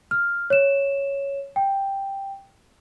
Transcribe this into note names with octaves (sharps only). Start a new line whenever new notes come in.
F6
C#5 E7
G5